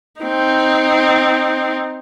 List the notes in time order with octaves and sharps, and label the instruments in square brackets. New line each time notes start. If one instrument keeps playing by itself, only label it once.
[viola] C4 D#4